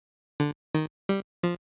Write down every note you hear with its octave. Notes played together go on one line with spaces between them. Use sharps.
D3
D#3
G3
F3